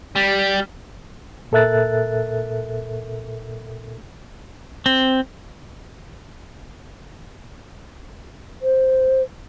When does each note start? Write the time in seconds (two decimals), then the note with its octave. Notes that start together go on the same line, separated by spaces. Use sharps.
0.16 G3
1.52 A#2 A4 A#4 E5 F#6 A6
4.86 C4
8.62 C5